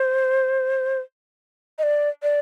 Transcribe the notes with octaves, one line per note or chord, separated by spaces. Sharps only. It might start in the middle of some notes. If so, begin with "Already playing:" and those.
Already playing: C5
D#5
D5
D5